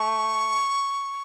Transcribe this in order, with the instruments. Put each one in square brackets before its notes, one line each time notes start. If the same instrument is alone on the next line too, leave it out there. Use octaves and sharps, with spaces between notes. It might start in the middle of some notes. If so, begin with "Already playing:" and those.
Already playing: [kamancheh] A3 [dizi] C#6